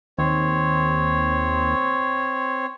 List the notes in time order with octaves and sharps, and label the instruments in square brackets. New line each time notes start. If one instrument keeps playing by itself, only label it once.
[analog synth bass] D#2 [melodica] C4 C#5